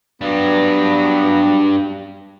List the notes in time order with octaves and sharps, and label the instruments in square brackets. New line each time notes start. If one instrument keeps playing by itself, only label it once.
[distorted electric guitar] G2 G3 [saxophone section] F#3 B3